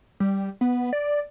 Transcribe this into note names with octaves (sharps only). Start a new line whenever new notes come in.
G3
B3
D5